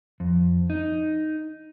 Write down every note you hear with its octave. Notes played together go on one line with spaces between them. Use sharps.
F2
D#4